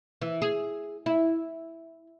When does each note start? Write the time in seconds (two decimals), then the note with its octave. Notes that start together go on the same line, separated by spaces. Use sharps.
0.22 E3
0.42 G#4
1.06 E4